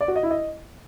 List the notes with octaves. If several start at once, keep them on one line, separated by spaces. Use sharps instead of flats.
D5
F#4
D#5
E4
D#5